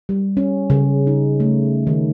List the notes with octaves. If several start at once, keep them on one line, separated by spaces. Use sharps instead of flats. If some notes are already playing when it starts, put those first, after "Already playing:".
G3
C#4
C#3
D#4
A3
D#3